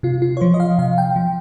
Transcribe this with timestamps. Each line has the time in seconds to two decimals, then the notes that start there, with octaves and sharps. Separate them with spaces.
0.03 C3 F4
0.22 F4
0.37 C#5
0.41 F3 C5
0.54 D#5
0.60 F5
0.79 C3 F5
0.98 G5
1.16 F3